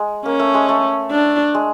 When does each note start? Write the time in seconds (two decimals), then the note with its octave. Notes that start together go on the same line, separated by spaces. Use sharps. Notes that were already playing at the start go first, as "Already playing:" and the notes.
Already playing: G#3
0.25 A#3 C#4
0.39 A3
0.54 G#3
0.69 A3
1.11 D4
1.55 G#3